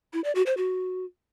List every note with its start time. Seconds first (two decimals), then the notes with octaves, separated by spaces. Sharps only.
0.13 E4
0.24 D5
0.35 F#4
0.46 C5
0.57 F#4